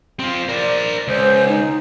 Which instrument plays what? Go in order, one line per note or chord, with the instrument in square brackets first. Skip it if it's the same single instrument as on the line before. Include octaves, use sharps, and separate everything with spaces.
[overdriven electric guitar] C4 F4
[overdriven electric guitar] A#4 C5 [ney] D5
[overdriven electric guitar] C#2 [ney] C5
[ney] D#4